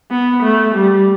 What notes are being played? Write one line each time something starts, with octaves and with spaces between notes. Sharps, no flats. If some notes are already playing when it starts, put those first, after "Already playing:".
B3
A3
G3